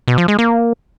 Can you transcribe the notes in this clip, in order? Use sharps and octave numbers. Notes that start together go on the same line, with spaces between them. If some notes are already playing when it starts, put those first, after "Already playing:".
B2
F3
G#3
A#3